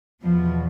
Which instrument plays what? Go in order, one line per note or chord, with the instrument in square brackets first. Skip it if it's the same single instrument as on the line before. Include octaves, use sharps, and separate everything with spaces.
[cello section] E2 B2 F3